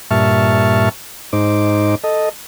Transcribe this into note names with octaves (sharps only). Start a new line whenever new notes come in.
G2 A#2 E5 A5 C#6 F6
G#2 D#4 C5 D6
A4 D#5